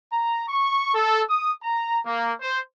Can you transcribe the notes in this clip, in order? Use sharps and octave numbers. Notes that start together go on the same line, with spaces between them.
A#5
C#6
A4
D#6
A#5
A#3
C5